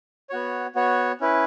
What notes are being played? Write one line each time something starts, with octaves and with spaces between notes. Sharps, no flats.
B3 F#4 C#5
B3 F#4 C#5
C#4 E4 B4